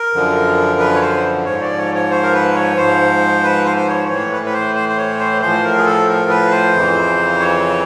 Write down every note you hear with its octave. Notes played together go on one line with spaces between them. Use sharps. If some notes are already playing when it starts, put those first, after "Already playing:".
Already playing: A#4
F#2 D3 F3
B4
C#5
C5
G#2 F3 C#5
D5
C#5
C#5
C5
A#4
B4
C#5
G#2 F3 C5
B4
C5
C5
C#5
A2 E3 C#5
B4
B4
C5
C5
C5
C#5
C5
A2 F3 C5
A#4
G#4
A4
A#4
B4
C5
F2 C#3 E3
C#5